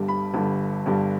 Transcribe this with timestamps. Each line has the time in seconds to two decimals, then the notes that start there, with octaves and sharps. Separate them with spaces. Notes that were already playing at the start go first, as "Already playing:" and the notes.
Already playing: G1 G2 D3 G3
0.08 B5
0.34 G1 G2 D3 G3
0.86 G1 G2 D3 G3